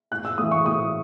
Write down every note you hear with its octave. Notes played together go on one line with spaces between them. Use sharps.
A2 F#6
E6
E3 A3 D#6
C#6
A2 D#6